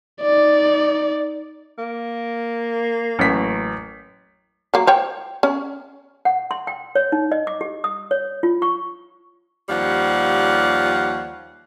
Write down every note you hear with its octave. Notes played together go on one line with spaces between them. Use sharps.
D#4 D5
A#3
A1 F#3 B6
F#3 A#3
C5 C#5 G5
C#4
F#5
C6
G5
C#5
D#4
D#5
D6
G4
D#6
C#5
F4
C#6
D#2 F3 G3 C#5 F5 F#5